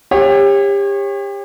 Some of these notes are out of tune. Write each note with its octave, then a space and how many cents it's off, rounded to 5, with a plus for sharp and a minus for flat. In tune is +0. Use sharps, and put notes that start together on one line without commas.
G4 +30 C#5 -25